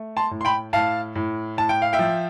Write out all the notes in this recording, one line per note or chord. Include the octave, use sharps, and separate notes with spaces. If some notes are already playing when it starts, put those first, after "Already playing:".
Already playing: A3
A5 C6
A2
C6
G5 B5
A2 F5 A5
A2
A2 A5
G5
F5
E5 G5
F3